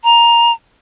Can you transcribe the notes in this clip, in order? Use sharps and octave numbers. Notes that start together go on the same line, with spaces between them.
A#5